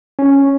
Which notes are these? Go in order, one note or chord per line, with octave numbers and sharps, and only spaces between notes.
C#4